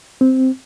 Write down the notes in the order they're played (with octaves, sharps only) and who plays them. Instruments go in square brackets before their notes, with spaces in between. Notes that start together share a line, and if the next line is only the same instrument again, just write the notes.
[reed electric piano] C4